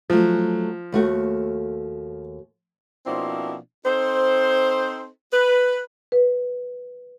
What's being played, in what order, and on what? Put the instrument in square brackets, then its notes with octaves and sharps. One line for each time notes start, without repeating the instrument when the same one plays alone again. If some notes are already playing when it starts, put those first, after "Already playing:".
[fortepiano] F3 [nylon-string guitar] F#3 A3
[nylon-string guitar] D#2 A3 F#4
[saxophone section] B2 F3 A#3 C4 D4 E4
C4 D#4 A4 C5
B4
[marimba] B4